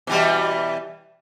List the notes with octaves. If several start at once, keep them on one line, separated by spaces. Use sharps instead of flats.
B2 E3 G3